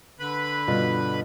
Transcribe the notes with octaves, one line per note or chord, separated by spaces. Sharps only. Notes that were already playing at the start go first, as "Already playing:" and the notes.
D3 B4 B5
G2 B2 F4